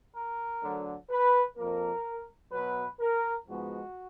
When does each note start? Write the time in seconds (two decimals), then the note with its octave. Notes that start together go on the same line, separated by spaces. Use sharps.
0.15 A#4
0.62 D2 D3 F#3
1.10 B4
1.57 F2 F3 A#3 A#4
2.52 B2 F#3 B3 B4
3.00 A#4
3.47 G#2 F3 G#3 B3 F#4